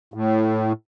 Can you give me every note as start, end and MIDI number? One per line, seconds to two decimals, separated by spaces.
0.14 0.72 45